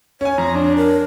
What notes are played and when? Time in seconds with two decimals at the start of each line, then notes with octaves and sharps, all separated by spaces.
0.21 C#4 C#5 G#5
0.38 F2 A#5
0.55 D4
0.77 A#4